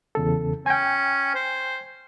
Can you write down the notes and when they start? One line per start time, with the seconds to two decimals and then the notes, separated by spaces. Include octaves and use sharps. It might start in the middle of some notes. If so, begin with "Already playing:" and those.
0.15 E2 C#3 A4
0.66 C#4 G5 G#5
1.35 C5